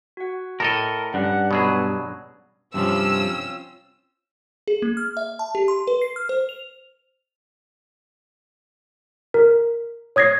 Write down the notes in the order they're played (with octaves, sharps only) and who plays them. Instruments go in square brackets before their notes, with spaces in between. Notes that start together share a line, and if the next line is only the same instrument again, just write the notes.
[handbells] F#4 F#5
[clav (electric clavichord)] A2 A4 D#5 [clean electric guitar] A#4 [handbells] A5 C#7
[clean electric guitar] G2 [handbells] C#4 D5 [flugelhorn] F#5
[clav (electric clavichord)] B2 F#3 G#4 [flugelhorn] B3
[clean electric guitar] G2 C3 F3 [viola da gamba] C4 C#4 F4 [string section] E6
[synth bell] G#4
A#3
F6
E5
A5
G4
C6
B4
C7
F6
C5
F7
[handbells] A#4
C#5 D#6 G#6 A#6 C7